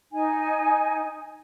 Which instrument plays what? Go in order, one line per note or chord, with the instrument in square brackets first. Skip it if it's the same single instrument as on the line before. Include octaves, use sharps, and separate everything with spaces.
[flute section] D#4 G#5